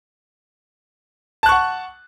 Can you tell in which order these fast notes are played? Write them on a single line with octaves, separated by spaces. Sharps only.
A5 F#6 C#6 F#5